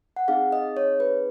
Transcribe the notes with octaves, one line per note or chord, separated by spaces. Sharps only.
F#5
C4 D#4 G#4 F5
D#5
C#5
B4